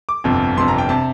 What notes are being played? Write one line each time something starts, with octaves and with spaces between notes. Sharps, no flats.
D6
G1 F2 C3
G1 F2 C3 C6
A#5
G5
C3 A5